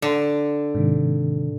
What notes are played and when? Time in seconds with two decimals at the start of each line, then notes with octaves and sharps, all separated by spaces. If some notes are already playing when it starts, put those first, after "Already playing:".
0.02 D3
0.75 G#2 C3 D#3